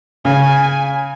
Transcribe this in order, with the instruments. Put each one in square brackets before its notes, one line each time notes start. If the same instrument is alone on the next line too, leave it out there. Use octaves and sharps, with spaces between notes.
[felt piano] C#3 [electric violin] G#5